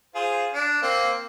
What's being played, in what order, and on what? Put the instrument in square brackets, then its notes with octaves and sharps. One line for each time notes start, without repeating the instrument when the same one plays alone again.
[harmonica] F4 G#4 C5
D4
A#3 C4